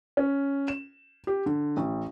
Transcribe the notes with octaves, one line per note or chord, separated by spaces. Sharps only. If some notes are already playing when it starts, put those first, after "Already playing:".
C#4
E7
G4
D3
A1